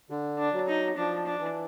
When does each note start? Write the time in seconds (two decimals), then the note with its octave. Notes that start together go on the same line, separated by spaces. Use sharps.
0.10 D3
0.39 D4
0.53 F#3
0.68 D#4
0.96 F3 D4
1.26 D4
1.40 E3